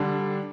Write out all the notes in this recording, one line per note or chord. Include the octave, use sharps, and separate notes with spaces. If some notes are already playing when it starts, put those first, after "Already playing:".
Already playing: D3 G3 D4